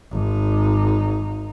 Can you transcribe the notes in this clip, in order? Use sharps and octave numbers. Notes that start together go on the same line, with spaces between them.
G#1 D#4